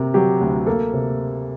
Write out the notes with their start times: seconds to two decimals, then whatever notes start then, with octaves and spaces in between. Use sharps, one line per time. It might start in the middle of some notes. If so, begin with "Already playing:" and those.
Already playing: C3 C4 A#4
0.14 F#3 G4
0.41 D2
0.66 A#3 A4
0.93 C3